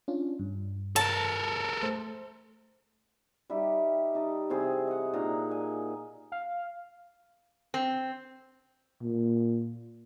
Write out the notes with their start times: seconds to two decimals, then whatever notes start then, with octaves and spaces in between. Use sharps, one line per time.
0.08 C#4 D4 F4
0.39 G2
0.96 A4 A#4 A5
1.83 A3 C5
3.50 G3 D#4 G4 E5
4.15 D#4 D#5 A5
4.50 C3 E3 C4 G#4
4.87 D#5 F#5
5.14 A#2 D4 D#4 A#5
5.51 D#5 G#5
6.32 F5
7.74 C4
9.02 A#2